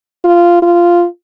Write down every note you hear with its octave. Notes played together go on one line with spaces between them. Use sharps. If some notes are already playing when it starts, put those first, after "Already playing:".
F4
F4